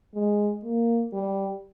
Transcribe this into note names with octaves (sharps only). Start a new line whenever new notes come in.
G#3
A#3
G3